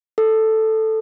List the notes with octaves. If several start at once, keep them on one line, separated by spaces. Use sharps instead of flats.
A4